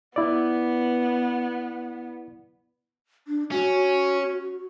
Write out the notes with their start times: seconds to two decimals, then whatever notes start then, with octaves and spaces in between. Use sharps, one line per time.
0.16 B3 E4 D5
3.28 D4
3.52 C#4 F#4